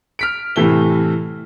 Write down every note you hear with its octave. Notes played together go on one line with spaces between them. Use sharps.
F6 B6 D7
A2 C3 E3 A3 G7